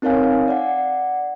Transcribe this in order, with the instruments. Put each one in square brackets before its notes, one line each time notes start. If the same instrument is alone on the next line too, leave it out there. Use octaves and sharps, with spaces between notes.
[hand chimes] C4 D#4 A#4 C#5 F5 G#5
D5 F#5